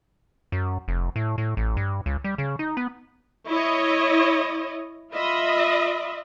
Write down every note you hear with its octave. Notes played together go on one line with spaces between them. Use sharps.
F#2
F1
A2
A2
A1
G2
C#2
G3
C#3
D#4
B3
E4 C#5 D#5
F4 D#5 E5 B5